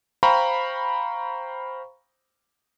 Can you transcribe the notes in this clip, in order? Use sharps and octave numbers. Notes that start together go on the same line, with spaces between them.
C5 F5 G5 A#5 B5 C#6